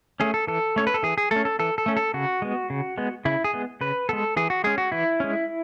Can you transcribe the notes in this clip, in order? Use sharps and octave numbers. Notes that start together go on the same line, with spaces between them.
A3 C#4 G#4
A4
E3 A4
A3 C#4 C#5
B4
A4
E3 G#4
G#4
A3 C#4 A4
A4
E3 A4
A4
A3 C#4
A4
C#3 F#4
G#3 B3
C#3
G#3 B3
C#3 E4
G#4
G#3 B3
C#3 B4
G#3 B3 A4
E3 G#4
F#4
G#3 C#4 G#4
F#4
E3 E4
G#3 C#4